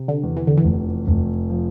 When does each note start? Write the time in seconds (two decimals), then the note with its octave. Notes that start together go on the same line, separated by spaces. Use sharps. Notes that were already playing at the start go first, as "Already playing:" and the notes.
Already playing: C3
0.08 D3
0.23 E2
0.37 E3
0.47 D3
0.57 E3
0.65 F1
1.08 F1
1.49 F3